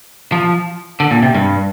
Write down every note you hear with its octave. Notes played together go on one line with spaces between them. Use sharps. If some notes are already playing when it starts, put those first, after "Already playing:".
F3
D3
A#2
C3
G2